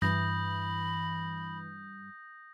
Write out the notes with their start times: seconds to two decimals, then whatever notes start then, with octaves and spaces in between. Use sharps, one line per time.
0.02 G2 E3 B5 D#6 G6 A#6